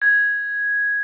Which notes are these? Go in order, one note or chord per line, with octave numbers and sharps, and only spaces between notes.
G#6